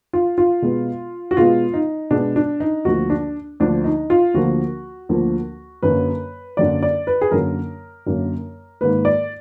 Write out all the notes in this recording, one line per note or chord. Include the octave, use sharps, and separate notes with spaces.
F4
F4
B2 G#3 B3
F#4
B2 G#3 B3 F4
D#4
B2 G#3 B3 D4
D4
D#4
D2 D3 F3 A#3 F#4
D4
D2 D3 F3 A#3 D4
D#4
F4
D2 D3 F3 A#3 F#4
D2 D3 F3 A#3
F#2 D3 F#3 A#3 B4
F#2 D3 F#3 A#3 D5
D5
B4
G#4
F#2 D3 F#3 A#3 A#4
F#2 D3 F#3 A#3
G#2 D#3 A#3 B4
D5